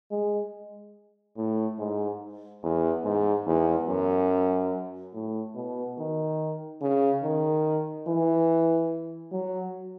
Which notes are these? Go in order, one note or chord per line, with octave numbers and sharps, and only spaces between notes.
G#3
A2
G#2
E2
G#2
E2
F#2
A2
B2
D#3
C#3
D#3
E3
F#3